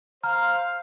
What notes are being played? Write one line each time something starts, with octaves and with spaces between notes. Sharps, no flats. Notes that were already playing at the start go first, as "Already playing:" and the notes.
C5 F5 A#5 F6